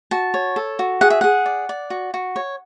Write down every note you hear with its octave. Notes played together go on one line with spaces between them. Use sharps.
F#4 A5
C#5
A4
F#4
G#4 F#5
E5
G#4 F#5
D5
D5
F#4
F#4
C#5